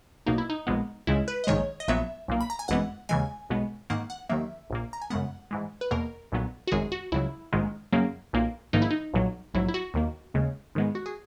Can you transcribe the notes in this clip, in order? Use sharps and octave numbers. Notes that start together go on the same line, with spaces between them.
B1 B2 A#3 D#4
E4
D#4
A#1 A#2 G#3 B3
C#2 C#3 G#3 E4
B4
D#5
A#1 G#2 D#3 G#3 C#5
D#5
A#1 A#2 F#3 B3 E5
B1 A#2 A#3
B5
A#5
G#5
G#1 F#2 E3 G#3 B3 F#5
D#2 C#3 E3 G#3 G#5
B1 B2 G#3 B3
G#2 D#3 A#3 F#5
F#5
D#2 D#3 F#3 A#3 E5
A#1 A#2 A#3
A#5
G#5
F#2 C#3 G#3 B3 F#5
G#2 E3 G#3
B4
E2 B2 A#3 A#4
B1 A#2 F#3 B3
F#4
G#1 F#2 D#3 G#3 G#4
F#4
C#2 C#3 F#3 E4
A#1 G#2 D#3 G#3
F#2 C#3 F#3 A#3
B1 A#2 A#3
A#1 G#2 D#3 A#3 D#4
E4
D#4
B1 A#2 F#3
A#1 G#2 F#3 E4
E4
F#4
D#2 D#3 A#3
D#2 C#3 G#3
G#2 D#3 G#3 B3
F#4
G#4